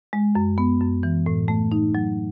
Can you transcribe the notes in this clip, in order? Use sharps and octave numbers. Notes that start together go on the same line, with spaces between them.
G#3
F#2
B3
F#2
E3
A2
A3
D#4
F#3